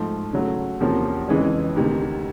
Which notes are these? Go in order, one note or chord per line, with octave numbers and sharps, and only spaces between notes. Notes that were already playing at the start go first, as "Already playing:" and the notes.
Already playing: G#2 F3 A3
C#3 F#3 A3
E2 C3 F3 A#3 C#4
F2 C#3 E3 G#3 C#4
D2 C3 D#3